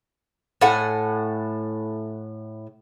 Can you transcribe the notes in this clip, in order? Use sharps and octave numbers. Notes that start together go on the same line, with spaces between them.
A2 A4 F#5 G#5